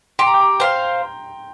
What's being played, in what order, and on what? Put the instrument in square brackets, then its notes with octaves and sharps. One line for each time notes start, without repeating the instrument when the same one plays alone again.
[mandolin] G4 [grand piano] C6
[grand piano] A#5
G5
A#5
[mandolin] C5 F5 [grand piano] G5